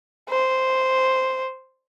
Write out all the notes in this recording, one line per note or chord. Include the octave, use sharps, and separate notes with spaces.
C5